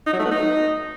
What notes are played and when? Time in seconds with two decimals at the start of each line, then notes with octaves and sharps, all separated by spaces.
0.07 D#4
0.13 F#3
0.19 A3
0.25 B3
0.31 D#4